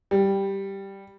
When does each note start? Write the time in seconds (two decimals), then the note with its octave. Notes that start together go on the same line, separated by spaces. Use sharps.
0.11 G3